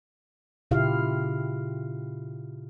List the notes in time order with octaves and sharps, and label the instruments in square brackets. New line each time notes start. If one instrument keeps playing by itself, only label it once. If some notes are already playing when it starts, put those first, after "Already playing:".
[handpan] A#2 C#3 E4 F4 G4 F5